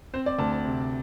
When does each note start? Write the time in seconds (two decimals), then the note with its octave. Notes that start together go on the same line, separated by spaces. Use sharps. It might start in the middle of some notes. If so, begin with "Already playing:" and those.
0.14 C4 C5
0.26 D5
0.39 D2 A5
0.52 A5
0.65 C3